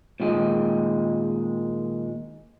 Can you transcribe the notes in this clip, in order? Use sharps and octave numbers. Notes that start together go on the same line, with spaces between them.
A#2 D#3 G#3